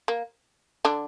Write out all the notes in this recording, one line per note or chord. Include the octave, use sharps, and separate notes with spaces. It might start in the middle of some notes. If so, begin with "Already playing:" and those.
A#3
D3 D4